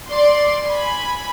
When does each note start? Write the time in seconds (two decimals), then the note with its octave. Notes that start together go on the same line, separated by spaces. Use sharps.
0.10 D5 C6
0.64 G#5 B5